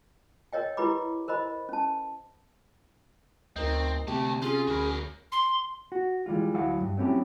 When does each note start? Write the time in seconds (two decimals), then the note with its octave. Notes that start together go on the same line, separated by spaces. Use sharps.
0.53 A#4 C#5 D#5 G5
0.77 E4 G4 B4 B5 D6
1.28 A#4 C5 D#5 B5
1.69 C#4 A5
3.56 D2 C4 D#4 A#4 D#5
4.08 D2 C3 A3 G4 A5
4.42 C#4 F4 G#4
4.68 D2 F#4 A#4 B5
5.32 C6
5.92 F#4
6.26 E3 G3 G#3 F4
6.54 D2 F#3 E4 F5 F#5
6.80 G2
6.97 F#3 A3 C4 C#4 E4 G4